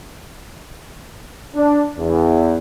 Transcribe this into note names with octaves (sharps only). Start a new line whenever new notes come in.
D4
E2